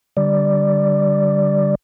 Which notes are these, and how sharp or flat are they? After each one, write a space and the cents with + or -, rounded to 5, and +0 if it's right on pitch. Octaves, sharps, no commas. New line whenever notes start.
D3 +0 G3 +0 D5 +0